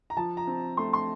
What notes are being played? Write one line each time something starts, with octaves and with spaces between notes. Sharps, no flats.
A#5
F3 A5
A#5
C4
A3 C6
C6